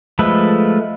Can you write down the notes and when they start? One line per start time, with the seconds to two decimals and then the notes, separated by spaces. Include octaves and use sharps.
0.19 F3 G#3 A3 A4 B4